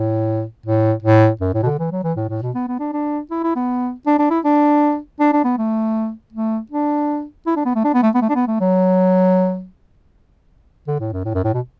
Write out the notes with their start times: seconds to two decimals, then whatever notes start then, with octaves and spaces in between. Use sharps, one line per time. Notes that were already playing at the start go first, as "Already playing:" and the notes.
Already playing: A2
0.66 A2
1.03 A2
1.41 F#2
1.54 A2
1.63 B2
1.66 D3
1.79 E3
1.92 F#3
2.04 E3
2.17 A2
2.29 A2
2.42 B2
2.55 B3
2.68 B3
2.79 D4
2.93 D4
3.31 E4
3.43 E4
3.56 B3
4.06 D4
4.19 D4
4.31 E4
4.44 D4
5.20 D4
5.33 D4
5.44 B3
5.58 A3
6.32 A3
6.71 D4
7.47 E4
7.56 D4
7.65 B3
7.75 A3
7.84 D4
7.94 B3
8.03 A3
8.15 B3
8.22 A3
8.29 D4
8.35 B3
8.47 A3
8.60 F#3
10.87 D3
11.00 A2
11.13 F#2
11.25 A2
11.35 F#2
11.44 A2
11.54 B2